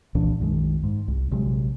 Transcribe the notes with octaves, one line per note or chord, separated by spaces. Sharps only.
C2 A#2 E3 D4
B1 F#2 D#3 G#3
G#2
C2
A#1 C3 F#3 G#3